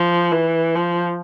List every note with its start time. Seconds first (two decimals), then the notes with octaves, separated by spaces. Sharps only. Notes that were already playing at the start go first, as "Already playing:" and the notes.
Already playing: F3
0.31 E3
0.76 F3